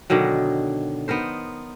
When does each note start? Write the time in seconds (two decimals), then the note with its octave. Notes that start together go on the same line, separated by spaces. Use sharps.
0.10 B2 D3 D#3 F#3
1.08 B3 D#4 A#4 C5